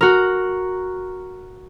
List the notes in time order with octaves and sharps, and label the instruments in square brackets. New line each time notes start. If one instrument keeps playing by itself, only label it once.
[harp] F#4 A#4